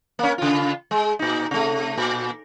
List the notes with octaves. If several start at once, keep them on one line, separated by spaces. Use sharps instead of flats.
A#3 C#4
C#3 F4
G#3
A#2 D#4
C3 A3
A#2